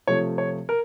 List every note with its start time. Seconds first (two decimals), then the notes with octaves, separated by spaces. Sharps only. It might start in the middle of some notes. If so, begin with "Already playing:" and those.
0.07 C3 F3 A3 C#5
0.38 C#5
0.69 A#4